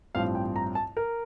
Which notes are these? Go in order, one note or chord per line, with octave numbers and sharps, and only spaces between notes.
A1 G2 F3 C4 F5
G5
A#5
A5
A#4